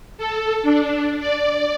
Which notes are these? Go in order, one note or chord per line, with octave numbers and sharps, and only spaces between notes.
A4
D4
D5